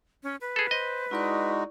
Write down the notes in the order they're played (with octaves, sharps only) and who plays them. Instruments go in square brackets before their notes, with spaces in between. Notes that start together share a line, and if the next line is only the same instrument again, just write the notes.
[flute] C#4
B4
[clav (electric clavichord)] G#4 A4
[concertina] C5 [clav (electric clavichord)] D#5
[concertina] G#3 D#4 F#4 [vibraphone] E4 D5 C#6